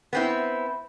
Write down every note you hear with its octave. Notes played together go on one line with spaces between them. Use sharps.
B3 C4 E4